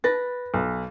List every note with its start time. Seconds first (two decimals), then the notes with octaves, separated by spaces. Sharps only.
0.04 B4 A6 A#6
0.54 B1